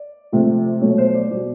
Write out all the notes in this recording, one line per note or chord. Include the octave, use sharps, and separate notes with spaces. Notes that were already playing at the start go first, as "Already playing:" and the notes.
Already playing: D5
C3 F3 A3
B2 F#3 A3 C#5
C5
D5
B2 G3 D5